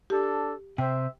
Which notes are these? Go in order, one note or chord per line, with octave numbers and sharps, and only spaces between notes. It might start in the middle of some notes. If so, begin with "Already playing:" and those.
D4 G4 A4
C3 C5 E5 G5